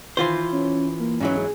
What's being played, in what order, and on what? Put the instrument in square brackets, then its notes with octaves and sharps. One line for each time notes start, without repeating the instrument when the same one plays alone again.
[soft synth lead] D#3 [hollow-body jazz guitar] E3 F4 C5
[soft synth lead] C#4
A#3
[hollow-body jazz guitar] G#2 E3 F#3 [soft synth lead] C#4
[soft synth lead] G#4